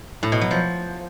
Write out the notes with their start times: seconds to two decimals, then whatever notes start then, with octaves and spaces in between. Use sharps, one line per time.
0.23 A2
0.32 B2
0.41 F#3
0.51 F3